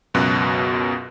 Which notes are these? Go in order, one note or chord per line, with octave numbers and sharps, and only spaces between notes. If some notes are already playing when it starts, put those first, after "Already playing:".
C#2 F#2 B2 F#6